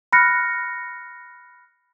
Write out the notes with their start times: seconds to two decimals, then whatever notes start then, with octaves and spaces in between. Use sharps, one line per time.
0.13 B5 F6 F#6 A#6 C#7